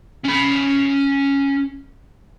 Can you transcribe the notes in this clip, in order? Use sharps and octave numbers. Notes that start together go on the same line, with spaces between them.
C#4 B5